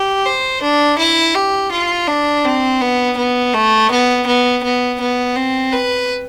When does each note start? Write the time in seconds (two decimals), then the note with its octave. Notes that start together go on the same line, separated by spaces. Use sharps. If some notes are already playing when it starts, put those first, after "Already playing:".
Already playing: G4
0.26 C5
0.62 D4
0.99 E4
1.35 G4
1.72 F4
2.08 D4
2.45 C4
2.81 B3
3.17 B3
3.54 A3
3.91 B3
4.27 B3
4.64 B3
5.01 B3
5.36 C4
5.72 B4